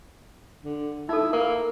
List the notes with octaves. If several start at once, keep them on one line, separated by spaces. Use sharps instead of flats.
D3
D#4 E4 A4
A#3 A#4